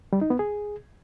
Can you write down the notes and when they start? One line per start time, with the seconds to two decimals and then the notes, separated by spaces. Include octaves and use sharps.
0.13 G3
0.21 D#4
0.30 B3
0.39 G#4